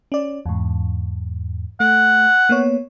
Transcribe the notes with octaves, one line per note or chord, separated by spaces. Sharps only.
C#4 D5
E2 G#2
A3 F#5
A#3 B3 C#5